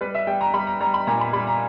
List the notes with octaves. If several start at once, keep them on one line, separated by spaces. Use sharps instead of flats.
G3 B4
E5
G3 G5
A#5
G3 B5
A#5
G3 A#5
B5
A#2 A#5
B5
G3 B5
A#5